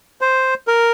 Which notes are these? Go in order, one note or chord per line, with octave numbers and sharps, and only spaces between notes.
C5
A#4